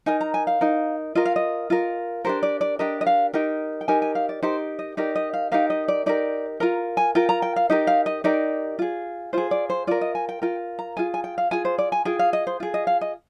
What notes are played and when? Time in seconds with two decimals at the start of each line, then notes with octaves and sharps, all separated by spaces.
0.06 D#4 A#4 G#5
0.21 A#5
0.34 G#5
0.47 F5
0.61 D#4 A#4
1.15 F4 A#4 D#5
1.25 F5
1.36 D#5
1.70 F4 A#4
2.25 D4 G4 A#4 C5
2.43 D5
2.61 D5
2.79 D4 G4 A#4 D#5
3.01 D#5
3.07 F5
3.34 D#4 G4 A#4 G5
3.81 G5
3.88 D#4 G4 A#4 G#5
4.02 G#5
4.15 F5
4.29 D5
4.43 D#4 G4 A#4 C5
4.79 D#5
4.97 D#4 G4 A#4 D5
5.16 D#5
5.34 F5
5.52 D#4 G4 A#4 F5
5.70 D#5
5.88 D5
6.06 D#4 G4 A#4 D5
6.60 F4 A#4 A#5
6.97 G#5
7.15 F4 A#4 G5
7.29 A#5
7.42 G5
7.56 F5
7.70 D#4 G4 A#4 D#5
7.87 F5
8.06 D#5
8.24 D#4 G4 A#4 D5
8.79 F4 G#4
9.33 F4 G#4 C5
9.51 D5
9.70 C5
9.87 F4 A#4 D5
10.01 D#5
10.15 G#5
10.29 G5
10.42 F4 A#4 G5
10.79 A#5
10.97 F4 G#4 G#5
11.14 G#5
11.24 G5
11.38 F5
11.51 F4 G#4 G#5
11.65 C5
11.78 D5
11.92 G#5
12.05 F4 G#4 G5
12.19 F5
12.33 D#5
12.47 C5
12.60 F4 G#4
12.74 D#5
12.87 F5
13.01 D#5